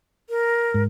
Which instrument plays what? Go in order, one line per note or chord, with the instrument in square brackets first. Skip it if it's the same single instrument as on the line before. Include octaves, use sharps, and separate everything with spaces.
[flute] A#4
[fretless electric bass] G#2